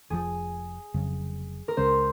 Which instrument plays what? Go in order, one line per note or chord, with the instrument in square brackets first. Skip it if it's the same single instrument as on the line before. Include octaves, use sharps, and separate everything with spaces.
[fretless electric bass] F1 F2 C3 F3 [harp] G#4
[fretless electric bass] F1 F2 C#3 F#3
[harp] A#4
[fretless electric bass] C#2 C#3 G#3 C#4 [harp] C5